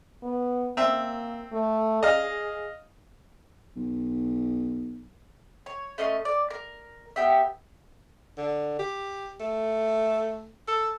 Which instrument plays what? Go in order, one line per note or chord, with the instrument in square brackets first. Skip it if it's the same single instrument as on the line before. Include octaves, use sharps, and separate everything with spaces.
[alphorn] B3
[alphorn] A#3 [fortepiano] C4 E5
[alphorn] A3
[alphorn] G#4 [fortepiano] D#5 F5
[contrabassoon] B1
[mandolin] C#5
A3 C#4 D#5 C6
D5
A#4
B3 G4 E5
[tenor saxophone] D3
G4
A3
A4